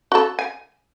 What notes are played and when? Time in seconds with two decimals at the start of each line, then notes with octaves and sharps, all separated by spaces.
0.12 F#4 A4
0.39 G#5